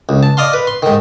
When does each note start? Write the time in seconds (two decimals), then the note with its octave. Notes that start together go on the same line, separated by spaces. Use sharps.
0.09 C#2
0.23 A5
0.37 D5 D#5 F5 C6
0.53 B4
0.67 C6
0.83 G#2 D#3